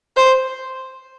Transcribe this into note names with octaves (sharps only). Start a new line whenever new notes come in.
C5